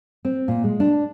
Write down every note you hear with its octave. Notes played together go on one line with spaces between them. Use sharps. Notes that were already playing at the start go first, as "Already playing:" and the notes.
C4
A#2
G#3
D4